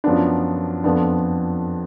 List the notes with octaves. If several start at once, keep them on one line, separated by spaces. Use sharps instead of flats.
F#2 F3 B3 D4
F2 F3 B3 D4